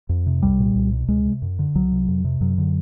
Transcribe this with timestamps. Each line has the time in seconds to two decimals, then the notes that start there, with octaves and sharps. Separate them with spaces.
0.09 F2
0.26 C3
0.42 C2 G3
0.59 A#2
0.75 C2
0.92 B2
1.08 C#2 G#3
1.25 C3
1.42 F#2
1.59 D3
1.75 C2 F#3
1.92 C3
2.08 F2
2.24 C3
2.41 F#2 F#3
2.58 D3